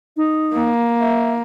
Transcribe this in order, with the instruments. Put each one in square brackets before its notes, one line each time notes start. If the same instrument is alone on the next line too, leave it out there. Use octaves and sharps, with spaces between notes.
[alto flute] D#4
[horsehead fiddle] A#3
[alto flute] E5